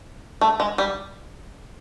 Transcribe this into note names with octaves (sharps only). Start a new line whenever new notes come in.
A3
G#3
G3